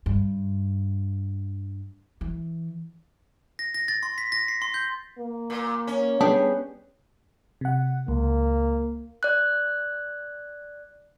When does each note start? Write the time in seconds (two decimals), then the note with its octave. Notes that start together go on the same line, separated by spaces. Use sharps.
0.06 G2
2.21 E3
3.59 A#6
3.74 A#6
3.88 A6
4.03 C6
4.18 B6
4.32 A#6
4.48 C7
4.62 C6
4.74 G6
5.18 A#3
5.50 A#2
5.87 C#4
6.21 G3 B3 D4 G4 G#4
7.61 C3 F#5
8.08 C#2 A#3
9.23 D5 F#6